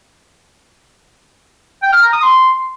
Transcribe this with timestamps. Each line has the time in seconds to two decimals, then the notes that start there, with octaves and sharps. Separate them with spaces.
1.83 G5
1.93 F6
2.03 A#5
2.13 D#6
2.23 C6